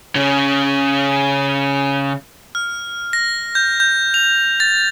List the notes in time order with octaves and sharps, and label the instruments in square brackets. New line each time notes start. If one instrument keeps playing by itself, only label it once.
[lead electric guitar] C#3 C#4
[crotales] F6
A#6
G6
G6
F7
A6